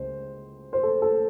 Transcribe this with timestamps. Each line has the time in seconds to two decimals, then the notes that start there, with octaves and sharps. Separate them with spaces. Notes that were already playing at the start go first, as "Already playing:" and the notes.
Already playing: C#2 C5
0.73 C5
0.83 A4
1.02 A4